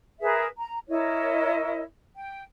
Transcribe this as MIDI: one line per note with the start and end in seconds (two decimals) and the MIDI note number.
0.21 0.44 68
0.21 0.44 70
0.21 0.44 71
0.21 0.44 76
0.57 0.78 82
0.88 1.80 64
0.88 1.80 70
0.88 1.80 73
0.88 1.80 75
2.14 2.42 79